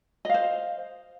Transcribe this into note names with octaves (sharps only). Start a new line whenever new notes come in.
C5 D#5 F5